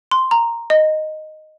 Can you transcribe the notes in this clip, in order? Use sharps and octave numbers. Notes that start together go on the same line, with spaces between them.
C6
A#5
D#5